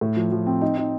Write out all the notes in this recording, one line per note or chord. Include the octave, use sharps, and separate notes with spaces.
A2
F3
F3
C4
D#4
D#4